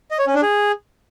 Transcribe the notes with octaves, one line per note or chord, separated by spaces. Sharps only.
D#5
C#5
C#4
D4
G#4